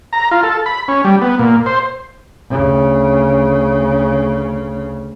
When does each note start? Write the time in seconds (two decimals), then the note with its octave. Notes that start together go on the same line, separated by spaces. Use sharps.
0.13 A#5
0.31 F4
0.43 A4
0.66 B5
0.88 C#4
1.05 G3
1.22 B3
1.39 A#2
1.66 C5
2.50 D2 C#3